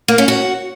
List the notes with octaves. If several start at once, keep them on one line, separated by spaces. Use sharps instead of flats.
A#3
C#4
F#4